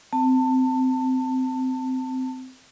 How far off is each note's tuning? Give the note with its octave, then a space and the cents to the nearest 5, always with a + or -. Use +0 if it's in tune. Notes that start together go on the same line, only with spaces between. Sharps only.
C4 -20 A5 +25